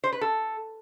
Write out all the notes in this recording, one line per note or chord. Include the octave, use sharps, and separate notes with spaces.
C5
B4
A4